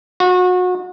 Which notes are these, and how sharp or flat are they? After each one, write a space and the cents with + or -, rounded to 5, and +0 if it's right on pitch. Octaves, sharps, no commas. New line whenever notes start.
F#4 -30